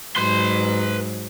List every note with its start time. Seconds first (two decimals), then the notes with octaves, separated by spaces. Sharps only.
0.16 G#2 F#3 B4 C6